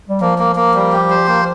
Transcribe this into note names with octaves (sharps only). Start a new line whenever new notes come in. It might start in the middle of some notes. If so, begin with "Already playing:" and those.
G3
F3 A#3
A#3
A#3
G3
G4
C5
A#3